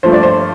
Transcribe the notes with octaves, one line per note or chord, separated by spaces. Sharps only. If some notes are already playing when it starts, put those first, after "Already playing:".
G2 F3 A3 C5
D5
C5